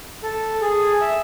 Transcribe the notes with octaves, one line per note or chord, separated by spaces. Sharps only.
A4
G#4
E5